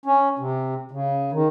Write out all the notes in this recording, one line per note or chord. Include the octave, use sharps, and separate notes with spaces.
C#4
C3
C#3
D#3